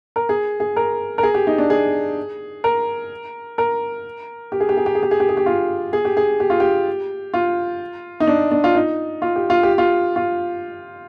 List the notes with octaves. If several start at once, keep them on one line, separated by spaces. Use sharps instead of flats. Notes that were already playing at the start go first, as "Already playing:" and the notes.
A#4
G#4
G#4
A#4
A#4
G#4
G4
D#4
D4
G#4
A#4
A#4
G4
G#4
G4
G#4
G4
G#4
G4
G#4
G4
G#4
G4
F4
G#4
G4
G#4
G4
F4
G4
F4
D#4
D4
D4
F4
D#4
F4
G4
F4
G4
F4
F4